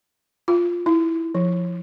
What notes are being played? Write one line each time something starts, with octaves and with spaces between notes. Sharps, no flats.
F4
E4
F3